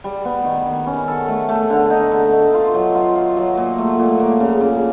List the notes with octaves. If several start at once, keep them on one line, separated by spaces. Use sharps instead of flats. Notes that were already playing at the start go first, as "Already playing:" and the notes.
G3
B3
D#3
D#3
C#4
A4
A3
A3
D3
D#4
D3
D#4
F4
F#3
F4
F4
F#3
A#2
A3
A#2
A#3
C#3
C#3